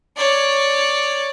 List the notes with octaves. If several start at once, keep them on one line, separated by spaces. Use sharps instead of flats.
C#5 D5